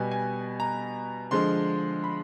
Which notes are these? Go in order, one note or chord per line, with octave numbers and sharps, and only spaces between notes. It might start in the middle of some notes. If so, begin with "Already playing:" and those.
Already playing: B2 G3 B3 G#5
G#5
A#5
D3 F3 G#3 C6
B5